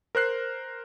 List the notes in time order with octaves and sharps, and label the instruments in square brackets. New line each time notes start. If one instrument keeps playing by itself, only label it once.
[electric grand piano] A#4 C5 F#6 C7